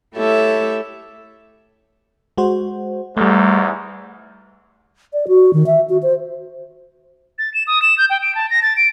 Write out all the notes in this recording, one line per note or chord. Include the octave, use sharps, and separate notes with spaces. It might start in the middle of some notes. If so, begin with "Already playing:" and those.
A3 E4 G4 A4 C#5 E5
G#3 F#4 C5
E2 G#2 G3 A3
D5
F#4
D#3
E5
F#4
C5
A6
E7
D#6
E7
G6
G5
D7
A5
A#6
A6
D7